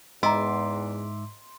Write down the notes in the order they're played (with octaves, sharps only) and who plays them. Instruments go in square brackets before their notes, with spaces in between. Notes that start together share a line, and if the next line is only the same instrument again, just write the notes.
[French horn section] E2 [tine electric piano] G#2 E5 D6 [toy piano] D#5 A#5 [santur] C6